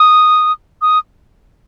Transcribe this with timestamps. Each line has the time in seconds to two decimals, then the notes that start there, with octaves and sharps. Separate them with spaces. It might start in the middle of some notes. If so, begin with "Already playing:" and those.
Already playing: D#6
0.82 D#6